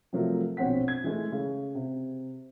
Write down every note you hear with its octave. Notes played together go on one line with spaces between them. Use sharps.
C3 F3 F#3 A3 A#4
A#1 B2 C4 C#5 F#5 B6
G#6
E3 G#3 A3
C#3
C3